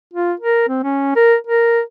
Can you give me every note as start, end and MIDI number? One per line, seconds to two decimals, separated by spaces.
0.14 0.33 65
0.40 0.68 70
0.68 0.82 60
0.83 1.12 61
1.16 1.35 70
1.47 1.80 70